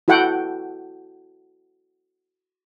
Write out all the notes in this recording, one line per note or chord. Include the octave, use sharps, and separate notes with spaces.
E4 F#4 A4 F#5 G5